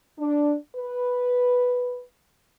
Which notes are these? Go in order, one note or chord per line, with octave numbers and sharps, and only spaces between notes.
D4
B4